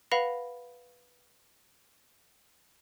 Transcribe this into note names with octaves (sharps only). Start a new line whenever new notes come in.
B4 F5 F#5 B5 A#6 F7